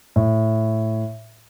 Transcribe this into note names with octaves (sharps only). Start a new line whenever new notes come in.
A2